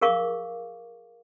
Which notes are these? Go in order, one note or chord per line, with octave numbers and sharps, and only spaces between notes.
G#4 A#4 F5 C#6 D6